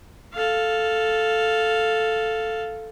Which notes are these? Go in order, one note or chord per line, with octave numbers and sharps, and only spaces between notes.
A4 F5